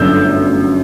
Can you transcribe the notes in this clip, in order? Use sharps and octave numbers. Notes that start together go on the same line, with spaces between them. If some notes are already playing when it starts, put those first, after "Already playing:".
Already playing: G1 F#2 D3 E6 G6